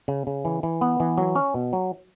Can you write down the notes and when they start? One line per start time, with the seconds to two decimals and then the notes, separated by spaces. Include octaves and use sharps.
0.08 C#3
0.27 C#3
0.45 E3
0.63 E3
0.81 B3
1.00 E3
1.18 F#3
1.35 C#4
1.54 B2
1.73 F#3